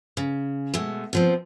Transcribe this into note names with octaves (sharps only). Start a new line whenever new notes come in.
C#3
B2 G#3 A3
B2 F3 C4